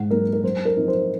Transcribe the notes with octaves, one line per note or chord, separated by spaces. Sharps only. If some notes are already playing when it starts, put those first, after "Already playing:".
Already playing: G#2 F#5
F#3 A#3 D#4 A#4
A#4
F#2 C5
A#4
F3 C4 D#4
C5